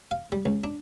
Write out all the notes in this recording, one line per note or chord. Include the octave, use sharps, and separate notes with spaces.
F5
G3
C#2
D4